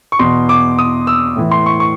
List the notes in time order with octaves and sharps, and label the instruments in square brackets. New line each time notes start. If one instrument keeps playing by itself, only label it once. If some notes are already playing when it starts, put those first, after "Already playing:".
[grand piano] C#6
E2 B2 C6
D6
D#6
E6
A2 E3
C6
C#6
C#6